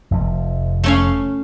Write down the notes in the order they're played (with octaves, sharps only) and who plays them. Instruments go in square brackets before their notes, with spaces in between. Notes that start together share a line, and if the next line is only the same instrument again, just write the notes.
[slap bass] F1 F3
[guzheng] A3 C#4 F5